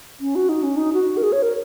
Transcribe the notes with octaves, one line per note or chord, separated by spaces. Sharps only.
C#4
F#4
D#4
C#4
D#4
F#4
A#4
G#4
C#5
A#4